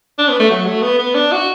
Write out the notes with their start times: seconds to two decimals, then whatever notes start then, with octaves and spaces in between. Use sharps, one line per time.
0.19 D4
0.29 B3
0.40 A3
0.50 F#3
0.66 A3
0.83 B3
0.99 B3
1.14 D4
1.32 F#4